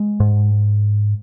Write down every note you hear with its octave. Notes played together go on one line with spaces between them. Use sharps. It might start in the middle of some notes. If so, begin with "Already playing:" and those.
Already playing: G#3
G#2